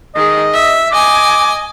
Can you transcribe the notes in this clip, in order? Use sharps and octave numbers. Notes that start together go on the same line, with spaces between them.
D#3 G#4 D#5
E5
D#5 G#5 D6